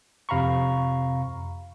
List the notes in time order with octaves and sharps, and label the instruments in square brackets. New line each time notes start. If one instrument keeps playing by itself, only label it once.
[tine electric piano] F2 C3 F5 A#5 B5 C#6